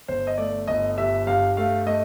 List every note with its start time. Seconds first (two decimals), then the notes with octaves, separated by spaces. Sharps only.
0.08 G1 C5
0.27 D#5
0.38 A3 D5
0.67 G1 D#5
0.97 G2 E5
1.27 G2 F5
1.57 A3 F5
1.86 A3 D#5